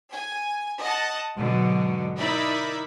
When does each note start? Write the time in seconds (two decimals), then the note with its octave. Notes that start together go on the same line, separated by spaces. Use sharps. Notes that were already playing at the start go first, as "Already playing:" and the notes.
0.11 G#5
0.80 D#5 F#5 A5
1.37 G#2 B2 D3 F#3
2.17 D#4 E4 A#4 D5 E5 B5